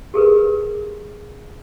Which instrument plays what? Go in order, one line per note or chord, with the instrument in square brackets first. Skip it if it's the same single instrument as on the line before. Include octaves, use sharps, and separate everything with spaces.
[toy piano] G4 G#4 A#4 B4